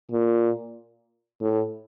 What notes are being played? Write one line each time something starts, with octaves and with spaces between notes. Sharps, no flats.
A#2
A2